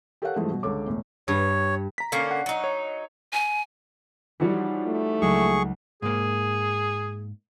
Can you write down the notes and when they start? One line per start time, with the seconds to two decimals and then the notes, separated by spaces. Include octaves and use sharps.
0.22 G4 A4 A#4 C#5 F5 F#5
0.36 G2 E3 F3 G#3 A3
0.49 G2 B2
0.63 C#2 D3 A4 C#5 D6
0.87 E1 A2
1.28 G2 C#5
1.98 A#5 B6
2.12 D3 A#3 C#4
2.31 F#5
2.46 F#3 D#4
2.64 C#5
3.33 G#5
4.40 E3 F3 G3 D#4 F#4 C#5
4.87 A3
5.21 C#2 F#3 G#3 G#4 C#6
6.02 G#2 A#3 G#4